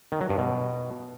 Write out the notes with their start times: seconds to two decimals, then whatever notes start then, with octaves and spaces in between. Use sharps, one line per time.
0.12 D#3
0.21 F#3
0.29 G2
0.38 B2